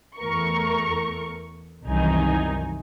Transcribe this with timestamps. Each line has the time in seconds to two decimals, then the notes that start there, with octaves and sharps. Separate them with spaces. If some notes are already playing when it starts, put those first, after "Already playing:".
0.18 E2 A3 A#4 C#6
1.85 C2 F#2 D#3 E3 D#4 G#5